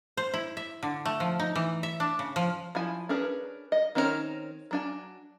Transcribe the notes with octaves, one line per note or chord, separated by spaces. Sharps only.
C5
E4
E5
D3
A3
F3
D#4
E3
E5
D4
C#3
F3
F3 E4 G#5
C#4 D4 G#4 A#4 B4
D#5
D#3 C4 C#4 D#4 A#4
F#3 D4 G#5